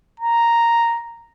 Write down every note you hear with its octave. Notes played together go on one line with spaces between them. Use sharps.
A#5